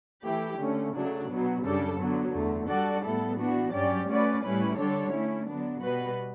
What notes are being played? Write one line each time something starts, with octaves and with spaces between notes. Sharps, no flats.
E3 A3 E4 G4
D3 A3 C#4
C#3 F#3 A3 D4
B2 F#3 B3
F#2 C#3 G3 D4 A4
D3 F#3 B3
E2 D3 A3
G3 D4 F#4 A4 D5
A2 G3 B3 E4 A4
E3 B3 D4 F#4
G2 F#3 C#4 G4 D5
A3 C#4 F#4 B4 D5
A2 G3 C#4 E4 B4
D3 G3 D4 A4 C#5
A3 C#4 E4
D3 F#3 B3 D4
B2 G3 B3 F#4 B4